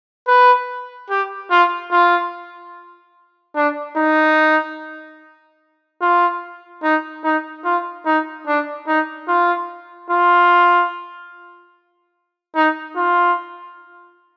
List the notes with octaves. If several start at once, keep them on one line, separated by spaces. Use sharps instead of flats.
B4
G4
F4
F4
D4
D#4
F4
D#4
D#4
F4
D#4
D4
D#4
F4
F4
D#4
F4